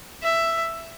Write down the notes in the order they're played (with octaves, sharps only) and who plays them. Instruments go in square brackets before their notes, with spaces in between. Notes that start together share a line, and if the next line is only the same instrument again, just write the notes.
[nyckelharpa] E5